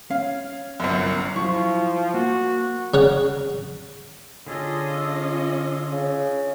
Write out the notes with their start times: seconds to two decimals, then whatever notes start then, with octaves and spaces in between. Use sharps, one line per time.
0.11 C#4 F5
0.80 G1 C2 F#2
1.36 F3 F#3 E4 C#6
2.14 A#3 F#4
2.94 C#3 C#5 F#5
4.47 D3 C#4 F4 G#4 A4 D#5
5.92 C#3